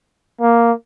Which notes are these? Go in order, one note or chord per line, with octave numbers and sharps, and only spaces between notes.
A#3